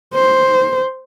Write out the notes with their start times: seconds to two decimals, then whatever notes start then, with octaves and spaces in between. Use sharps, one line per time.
0.14 C5